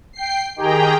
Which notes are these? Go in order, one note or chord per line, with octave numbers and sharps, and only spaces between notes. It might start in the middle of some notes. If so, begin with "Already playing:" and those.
G5 C7
D#3 G4 G#4 G5 A#5